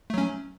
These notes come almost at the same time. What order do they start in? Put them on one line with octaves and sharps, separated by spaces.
A3 F#3 C#4